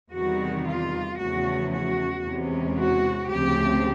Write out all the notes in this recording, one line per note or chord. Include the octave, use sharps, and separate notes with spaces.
E2 C3 D#3 G3 F#4
F4
E2 C#3 F3 A3 C#4 F#4
F#4
E2 C3 E3 G#3 C#4
F#4
D2 C#3 F3 A3 C4 G4